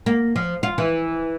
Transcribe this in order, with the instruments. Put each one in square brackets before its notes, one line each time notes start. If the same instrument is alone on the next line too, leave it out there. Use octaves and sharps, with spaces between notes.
[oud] A#3
F3
F4
E3